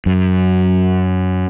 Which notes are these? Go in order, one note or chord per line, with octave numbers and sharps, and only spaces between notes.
F#2